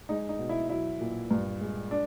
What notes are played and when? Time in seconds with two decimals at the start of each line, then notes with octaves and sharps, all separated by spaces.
0.09 G#3 D#4
0.29 D#4
0.39 B2
0.49 E4
0.69 F#3 E4
1.00 A#2
1.31 G2
1.61 G#3
1.91 D4